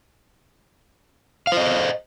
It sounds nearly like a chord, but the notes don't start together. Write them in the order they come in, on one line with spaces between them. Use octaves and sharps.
F5 C5 D#5